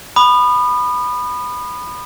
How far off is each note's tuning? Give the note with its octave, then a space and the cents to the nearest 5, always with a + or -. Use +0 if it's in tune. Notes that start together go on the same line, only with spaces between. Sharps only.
B5 +0 D#6 -35